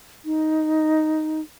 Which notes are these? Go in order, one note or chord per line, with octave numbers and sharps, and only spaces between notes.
D#4